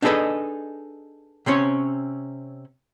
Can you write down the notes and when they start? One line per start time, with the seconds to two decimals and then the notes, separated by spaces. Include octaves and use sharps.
0.02 D4 D#4 G#4 A4 B4 D#5
1.46 C3 C4 C#4 C#5